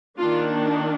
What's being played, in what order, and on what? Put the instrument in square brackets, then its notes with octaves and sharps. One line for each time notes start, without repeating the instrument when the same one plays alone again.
[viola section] D#3 A#3 D4 F4